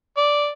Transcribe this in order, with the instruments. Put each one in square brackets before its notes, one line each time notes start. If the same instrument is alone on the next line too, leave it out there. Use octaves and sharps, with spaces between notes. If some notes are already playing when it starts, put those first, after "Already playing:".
[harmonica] D5